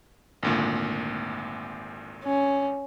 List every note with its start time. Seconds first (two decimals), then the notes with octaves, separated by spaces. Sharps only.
0.43 G#1 D2 A#2
2.23 C#4